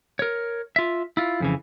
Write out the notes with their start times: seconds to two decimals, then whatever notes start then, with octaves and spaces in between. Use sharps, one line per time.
0.19 A#4 C#5
0.76 F4 E5
1.17 E4 F4
1.40 F2 C#3 E3